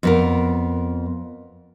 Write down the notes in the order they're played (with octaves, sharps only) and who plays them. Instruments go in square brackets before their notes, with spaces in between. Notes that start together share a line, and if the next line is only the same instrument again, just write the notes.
[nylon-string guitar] F2 B3 A#4